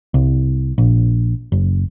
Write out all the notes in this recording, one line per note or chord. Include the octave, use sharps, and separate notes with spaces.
C2
A#1
F#1